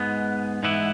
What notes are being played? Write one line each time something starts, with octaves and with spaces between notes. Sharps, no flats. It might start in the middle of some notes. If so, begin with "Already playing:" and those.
Already playing: G#2 G#3 B3
G#2 E3 B3 E4